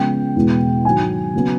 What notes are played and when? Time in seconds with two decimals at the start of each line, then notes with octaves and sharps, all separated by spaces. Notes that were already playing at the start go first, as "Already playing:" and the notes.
Already playing: C#3 F3 G#3 B3 G5
0.36 E2 B2 G#3 B3
0.85 G#2 D#3 F#3 G#5
1.34 C#3 F#3 B3